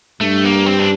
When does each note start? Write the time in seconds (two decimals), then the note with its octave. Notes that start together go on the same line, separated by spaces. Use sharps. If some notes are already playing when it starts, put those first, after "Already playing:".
0.21 G2 A3
0.45 A#3
0.66 C4
0.79 D4